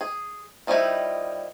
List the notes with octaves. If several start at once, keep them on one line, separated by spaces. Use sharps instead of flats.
G#4
D#3 F3 G3 D#4 E4